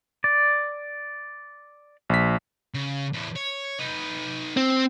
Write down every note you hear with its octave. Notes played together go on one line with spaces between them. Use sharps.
D5
A#1 B6
C#3
E2 A2
C#5
D#4 B4
C4